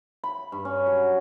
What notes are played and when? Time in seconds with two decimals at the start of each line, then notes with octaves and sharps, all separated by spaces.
0.24 B5
0.52 G2
0.65 C#4
0.86 F#3